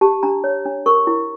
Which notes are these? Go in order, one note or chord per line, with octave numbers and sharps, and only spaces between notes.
G4 A5
D4 A#5
C#5
D4
A#4 C#6
E4